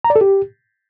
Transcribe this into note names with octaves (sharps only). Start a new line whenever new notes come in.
A#5
D5
A4
G4